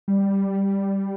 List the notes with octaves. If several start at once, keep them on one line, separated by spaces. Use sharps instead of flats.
G3